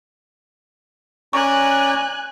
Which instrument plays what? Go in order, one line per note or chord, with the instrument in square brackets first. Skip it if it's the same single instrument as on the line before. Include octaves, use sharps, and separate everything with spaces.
[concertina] C#4 D5 A#5 [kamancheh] G#5 F#6 [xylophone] C#6